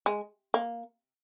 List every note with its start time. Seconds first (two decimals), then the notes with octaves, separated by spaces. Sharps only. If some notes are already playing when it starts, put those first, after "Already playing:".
0.06 G#3
0.54 A#3